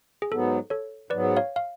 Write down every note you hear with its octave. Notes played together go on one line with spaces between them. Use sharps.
G#4
G#2 F#3 B3 A4
A4 C#5
G#2 F#3 B3 B4 D5
C#5 F5
F5